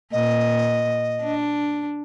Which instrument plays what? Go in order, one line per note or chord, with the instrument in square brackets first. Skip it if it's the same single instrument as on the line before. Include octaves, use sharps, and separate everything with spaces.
[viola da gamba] A#2 [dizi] D#5
[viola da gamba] D4